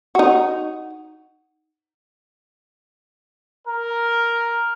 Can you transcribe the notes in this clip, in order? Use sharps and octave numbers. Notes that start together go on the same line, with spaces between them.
D#4 F#4
A#4